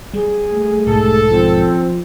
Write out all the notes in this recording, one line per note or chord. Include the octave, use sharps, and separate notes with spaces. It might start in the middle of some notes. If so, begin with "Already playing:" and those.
G3 G#4
A3
B1 G#2 A4
F3 C4